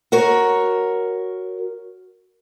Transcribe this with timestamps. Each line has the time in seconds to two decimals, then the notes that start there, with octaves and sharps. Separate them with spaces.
0.12 F#4 A#4 C#5